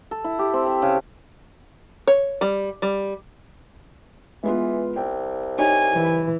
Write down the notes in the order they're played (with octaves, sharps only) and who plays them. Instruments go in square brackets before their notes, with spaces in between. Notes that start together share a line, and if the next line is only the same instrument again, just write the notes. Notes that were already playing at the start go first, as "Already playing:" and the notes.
[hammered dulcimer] A4
E4
G4
C4
E5
C#3
[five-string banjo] C#5
G3
G3
[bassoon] E3 [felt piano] G#3 B3 F4
[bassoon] C2 [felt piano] G5
[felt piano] D#4 G4 C#5 [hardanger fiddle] G#5
[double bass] E3